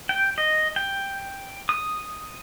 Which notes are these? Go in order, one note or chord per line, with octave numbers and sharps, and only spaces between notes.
G5
D#5
G5
D#6